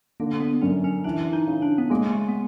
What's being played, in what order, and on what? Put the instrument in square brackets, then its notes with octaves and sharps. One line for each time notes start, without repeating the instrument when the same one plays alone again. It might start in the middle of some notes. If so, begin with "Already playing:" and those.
[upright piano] D3 [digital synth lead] A#3
[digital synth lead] B3
[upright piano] F#2 [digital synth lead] C#4
[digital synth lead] C#4
[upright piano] E3 [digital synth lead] D4
[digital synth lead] D#4
[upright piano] C#3
[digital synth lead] D4
B3
[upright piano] G#3 [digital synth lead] A#3
[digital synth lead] A3
B3